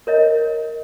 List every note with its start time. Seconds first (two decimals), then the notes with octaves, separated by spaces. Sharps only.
0.07 A#4 C#5 D#5